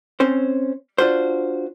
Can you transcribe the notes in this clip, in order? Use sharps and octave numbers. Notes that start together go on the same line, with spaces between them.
C4 C#4 C5
D4 F4 F#4 C5